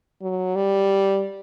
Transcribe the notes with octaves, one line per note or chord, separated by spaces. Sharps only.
F#3
G3